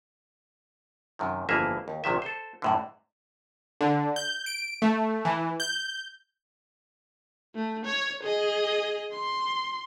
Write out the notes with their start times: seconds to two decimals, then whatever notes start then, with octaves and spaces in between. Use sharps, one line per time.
1.19 F#2 C3 D#3
1.49 G1 F2 E3 A#3 G#4 E5
1.88 D#2
2.04 A#1 C3 D#3 E5
2.22 A4 C5
2.62 F#2 A2 D3
3.81 D3
4.16 G6
4.46 D7
4.82 A3
5.25 E3
5.60 G6
7.55 A3
7.85 C#5
8.23 G#4 D#5
9.12 C6